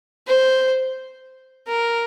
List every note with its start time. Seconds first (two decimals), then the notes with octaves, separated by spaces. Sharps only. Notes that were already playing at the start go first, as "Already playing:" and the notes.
0.27 C5
1.68 A#4